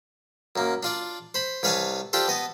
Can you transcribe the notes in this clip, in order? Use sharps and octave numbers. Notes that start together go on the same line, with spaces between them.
F#2 A#3
D4 F4 D5
C5 B5
C2 B4 C#5 F5 G#5 A5
D4 F4 G4 A4 C5
B3 D#5 A5